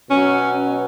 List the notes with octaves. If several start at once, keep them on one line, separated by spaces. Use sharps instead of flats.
B2 F#3 C#4